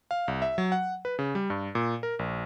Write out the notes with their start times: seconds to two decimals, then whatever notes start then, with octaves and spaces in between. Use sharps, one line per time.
0.11 F5
0.28 C2
0.42 E5
0.58 F#3
0.72 F#5
1.05 B4
1.19 C#3
1.35 G3
1.50 G2
1.75 A#2
2.03 A#4
2.19 A#1